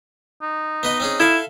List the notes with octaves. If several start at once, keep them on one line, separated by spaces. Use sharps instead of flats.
D#4
B3 B4 D#5
C4 C#4 G#4
E4 A4 E5 F5